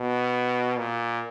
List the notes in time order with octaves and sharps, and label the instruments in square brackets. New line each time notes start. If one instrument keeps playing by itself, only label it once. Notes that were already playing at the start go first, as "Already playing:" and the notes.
Already playing: [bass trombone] B2
A#2